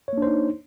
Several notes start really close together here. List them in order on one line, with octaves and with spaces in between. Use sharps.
C#5 A#3 D4 C5 D#4